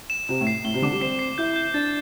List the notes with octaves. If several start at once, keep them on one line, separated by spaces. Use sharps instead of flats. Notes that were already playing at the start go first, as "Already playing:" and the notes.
E7
C3 E7
A2
C7
A2 G7
C3
D3 D6
G3
C4 C7
C7
E4 G6
G6
D4 A6